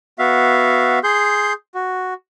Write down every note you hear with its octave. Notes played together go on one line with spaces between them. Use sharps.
B3 F#4 E5 F5
G#4 C6 G6
F#4